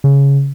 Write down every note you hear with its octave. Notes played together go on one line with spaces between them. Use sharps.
C#3